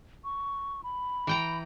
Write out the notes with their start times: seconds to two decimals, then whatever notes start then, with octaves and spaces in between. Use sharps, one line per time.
0.24 C#6
0.84 B5
1.27 E3 G5 A#5